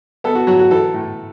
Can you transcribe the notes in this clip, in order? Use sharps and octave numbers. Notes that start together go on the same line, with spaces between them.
B3 A4
F#4
F#3 F#4
F#4
E3 A4
A2